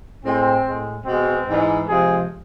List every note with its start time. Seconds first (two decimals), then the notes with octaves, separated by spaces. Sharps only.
0.24 A2 G#3 C4
0.65 A2 G#3
1.06 B2 G#3 C4
1.48 G#2 E3 G#3
1.89 C3 F3 G#3 G#4